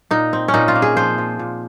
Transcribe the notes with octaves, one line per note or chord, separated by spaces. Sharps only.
A#2 D#4
C4
C#4
A#2 D#4
F4
A#3
G#4
F3 C5
F3
A#2